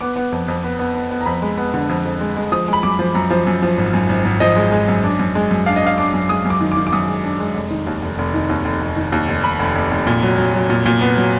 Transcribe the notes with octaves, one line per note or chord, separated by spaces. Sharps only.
B3 D6
B3
F2
F2
B3
B3
B3
B3
A#5
F2 B5
G#3
B3
D3
F2
F2
G#3
G#3
F3 D#6
G#3 B5
F#2 D6
F3
F#2 A#5
F3
F#2
F3
G#1
F#2
G#1
G#1
F3 D#5
G#3
G#3
F#2
D4
F#2
G#3
F#2
D4 F5
D#5
D4 F5
D4 D6
F#2
G#3 D#6
F#2
D6
D#3
D6
D#3
D6
F#2 D#6
G#3
D4
G#3
F1
D#3
D#2
F1
F1
D#3
D#2
F1
F1
D#3
D#2
F1
F1 B5
F1
F1
F1
A#2
F#3
F#3
F#3
A#2
A#2
B3
F#3